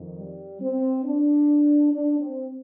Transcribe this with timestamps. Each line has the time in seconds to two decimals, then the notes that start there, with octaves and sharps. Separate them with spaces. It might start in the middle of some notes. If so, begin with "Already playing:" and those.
Already playing: F2 D#3
0.17 G3
0.60 C4
1.04 D4
1.91 D4
2.20 C4